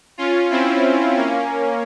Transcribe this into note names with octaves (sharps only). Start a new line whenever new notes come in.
C#4 F4
C4 E4
A#3 C#4